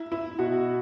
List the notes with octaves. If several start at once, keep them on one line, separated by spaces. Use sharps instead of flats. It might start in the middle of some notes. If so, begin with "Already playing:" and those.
Already playing: E4
E4
B2 F#4